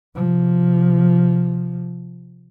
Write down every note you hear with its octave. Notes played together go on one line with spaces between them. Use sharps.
C3 F3